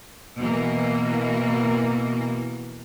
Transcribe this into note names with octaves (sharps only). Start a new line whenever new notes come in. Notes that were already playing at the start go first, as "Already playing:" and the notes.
B2 E3 A#3